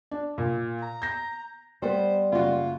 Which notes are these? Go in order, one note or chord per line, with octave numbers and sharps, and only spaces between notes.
D4
A#2
A#5
G6 A#6
G3 B3 C5
F#1 F4 F#4